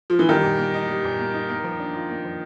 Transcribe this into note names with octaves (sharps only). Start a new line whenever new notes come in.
F3
E3
D#3 G3
A#2
A#3
D#4
G3
A#2
A#3
D#4
A#3
F3
D4
F4
A#3
F3